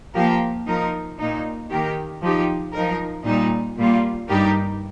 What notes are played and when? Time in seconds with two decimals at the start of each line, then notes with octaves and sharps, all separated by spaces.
0.14 F3 A#3 G4 A#4
0.66 F3 D#4 A#4
1.19 A#2 A#3 D#4
1.70 D#3 A#3 G4 A#4
2.21 F3 D#4 G4
2.73 F3 D#4 A#4
3.25 A#2 G3 D#4
3.77 A#2 G3 A#3 F4
4.28 G2 G3 D#4 G4 A#4